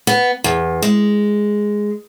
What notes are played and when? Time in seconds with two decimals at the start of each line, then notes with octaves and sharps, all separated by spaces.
0.07 B3
0.44 E2
0.82 G#3